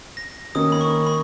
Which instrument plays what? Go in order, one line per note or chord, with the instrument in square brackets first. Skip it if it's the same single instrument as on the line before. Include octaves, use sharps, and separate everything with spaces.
[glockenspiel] A#6
[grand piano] D#3 A#3 C#4 [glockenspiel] D#6
[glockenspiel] B5
C#6
B5